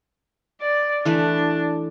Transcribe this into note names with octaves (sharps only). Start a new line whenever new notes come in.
D5
E3 A3 D4 B4